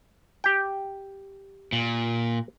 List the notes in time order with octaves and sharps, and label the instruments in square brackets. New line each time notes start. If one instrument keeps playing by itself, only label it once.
[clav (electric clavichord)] G4 G5
[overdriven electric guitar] A#2